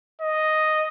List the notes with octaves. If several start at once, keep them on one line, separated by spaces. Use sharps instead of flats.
D#5